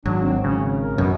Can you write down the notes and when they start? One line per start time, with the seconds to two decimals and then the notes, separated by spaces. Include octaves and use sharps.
0.05 G#1 F#3 D4
0.22 C4
0.44 C#3 C#4
0.76 A#4
0.98 F#2 B2